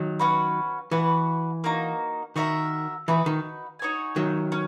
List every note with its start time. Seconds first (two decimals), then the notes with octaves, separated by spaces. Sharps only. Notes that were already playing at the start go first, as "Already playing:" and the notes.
Already playing: D#3 F#3
0.19 C#4 F#4 B4
0.91 E3 F#4 B4 F#5
1.64 A#3 D#4 F#4
2.36 D#3 F#4 A#4 E5
3.08 E3 D#4 F#4 B4
3.26 D#3
3.79 D#4 F#4 C#5 G#5
4.16 D#3 F#3
4.52 C#4